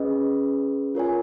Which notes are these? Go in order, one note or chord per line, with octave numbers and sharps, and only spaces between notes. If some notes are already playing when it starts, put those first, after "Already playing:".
Already playing: C#4 G#4 B4 D#5
F4 A#4 C#5 G#5